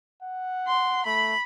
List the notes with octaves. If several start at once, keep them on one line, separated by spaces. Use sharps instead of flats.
F#5
C6
A3 B5